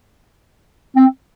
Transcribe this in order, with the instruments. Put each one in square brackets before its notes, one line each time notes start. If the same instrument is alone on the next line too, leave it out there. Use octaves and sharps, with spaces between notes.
[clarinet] C4